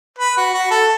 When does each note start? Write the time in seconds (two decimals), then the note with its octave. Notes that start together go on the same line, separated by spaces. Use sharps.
0.19 B4
0.38 F#4
0.54 F#4
0.71 A4